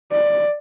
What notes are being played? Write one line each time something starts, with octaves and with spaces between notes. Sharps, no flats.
D5